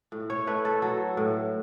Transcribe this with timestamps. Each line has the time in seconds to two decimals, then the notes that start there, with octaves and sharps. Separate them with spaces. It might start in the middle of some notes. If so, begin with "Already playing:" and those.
0.12 A2
0.30 C#5
0.47 A3 B4
0.65 A4
0.82 F#3 A4
1.17 A2